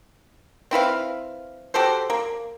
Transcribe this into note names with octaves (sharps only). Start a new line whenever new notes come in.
C4 E4 B4 F5
F#4 G4 A4 C5
A#3